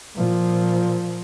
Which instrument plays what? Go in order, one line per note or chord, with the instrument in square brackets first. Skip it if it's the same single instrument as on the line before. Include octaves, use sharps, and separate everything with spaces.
[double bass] A#2 F3